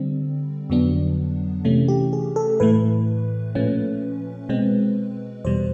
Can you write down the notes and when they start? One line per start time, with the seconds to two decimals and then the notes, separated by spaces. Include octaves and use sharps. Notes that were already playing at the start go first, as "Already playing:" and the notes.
Already playing: D3 G3 C4
0.70 F2 D3 F#3 B3 D4
1.65 C3 E3 A3 C#4
1.88 G4
2.13 G#4
2.36 A4
2.60 A2 E3 A3 B4
3.55 A#2 F3 A3 C#4
4.49 B2 G#3 C4
5.45 E2 B2 G3 C5